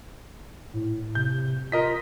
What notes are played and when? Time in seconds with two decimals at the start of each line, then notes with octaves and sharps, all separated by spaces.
0.73 A2
1.15 C3 G6
1.72 F4 A#4 D#5 B6